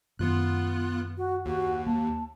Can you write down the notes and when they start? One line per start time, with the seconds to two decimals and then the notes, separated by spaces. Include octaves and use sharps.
0.19 F#2 D#3 G#3 B3 F4 F#6
1.18 F#4
1.46 D#2 F#4
1.87 A#3 A5